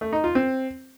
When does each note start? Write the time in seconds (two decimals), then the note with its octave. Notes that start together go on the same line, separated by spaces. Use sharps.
0.01 A3
0.13 D#4
0.24 F4
0.35 C4